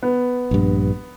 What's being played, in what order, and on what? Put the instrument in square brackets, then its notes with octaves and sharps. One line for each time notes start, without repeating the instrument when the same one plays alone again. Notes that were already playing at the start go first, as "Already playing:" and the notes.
[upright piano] B3
[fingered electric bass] A#1 G2